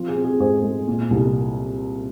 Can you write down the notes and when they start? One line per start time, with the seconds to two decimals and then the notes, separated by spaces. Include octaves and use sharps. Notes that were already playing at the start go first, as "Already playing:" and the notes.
Already playing: F3 C4 F4
0.08 G#4
0.16 C4
0.24 G#4
0.40 G#2 G#4 C5
0.63 G#3
0.88 A#2
1.11 C2